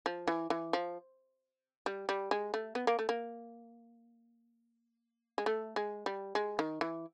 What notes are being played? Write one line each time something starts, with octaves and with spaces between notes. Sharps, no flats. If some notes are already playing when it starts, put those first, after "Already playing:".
F3
E3
E3
F3
G3
G3
G#3
A3
B3
A#3
A3
A#3
G#3
A3
G#3
G3
G#3
D#3
E3